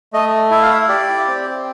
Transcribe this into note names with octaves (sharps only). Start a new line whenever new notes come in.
A3 D#5
E4 E5
F5
E5
G4 D5
C4